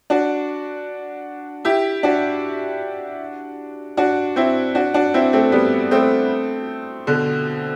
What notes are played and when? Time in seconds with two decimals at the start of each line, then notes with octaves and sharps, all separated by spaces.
0.10 D4 F#4
1.65 E4 G4
2.03 D4 F#4
3.97 D4 F#4
4.36 C4 E4
4.75 D4 F#4
4.94 D4 F#4
5.14 C4 E4
5.33 A3 C4
5.52 G3 B3
5.91 A3 C4
7.07 B2 D3